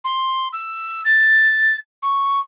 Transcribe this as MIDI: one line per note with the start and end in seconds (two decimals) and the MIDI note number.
0.04 0.48 84
0.52 1.01 88
1.04 1.76 93
2.02 2.39 85